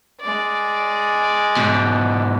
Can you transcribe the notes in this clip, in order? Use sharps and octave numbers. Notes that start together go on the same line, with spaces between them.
G#3 D5
G#2 B2